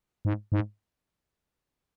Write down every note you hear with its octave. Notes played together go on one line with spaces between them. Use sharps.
G#2
G#2